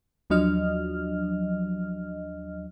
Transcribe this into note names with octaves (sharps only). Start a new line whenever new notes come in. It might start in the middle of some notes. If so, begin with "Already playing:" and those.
D#2 F3 F#3 D4 D#5 F6